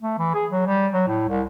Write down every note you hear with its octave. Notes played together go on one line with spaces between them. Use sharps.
A3
E3
G#4
F#3
G3
F#3
A2
C2